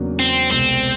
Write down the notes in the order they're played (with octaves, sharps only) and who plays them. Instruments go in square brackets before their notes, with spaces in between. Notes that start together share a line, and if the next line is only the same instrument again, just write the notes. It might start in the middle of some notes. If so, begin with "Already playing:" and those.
Already playing: [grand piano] E2 C#3 F#3 A#3 D4
[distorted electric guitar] C4
[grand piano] C2 B2 G#3 [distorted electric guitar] C4